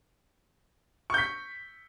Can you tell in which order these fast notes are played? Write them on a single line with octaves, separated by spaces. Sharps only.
C#6 G6 B6